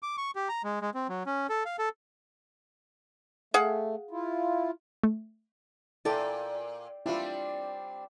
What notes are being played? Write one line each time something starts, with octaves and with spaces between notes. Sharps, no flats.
D6
C#6
G4
A#5
G#3
G#3
C4
F#3
C#4
A4
F5
A4
A3 G#4 F5 F#5
E4 F4
A3
A#2 E4 A4 D5 G5
G3 C4 D4 E4 F4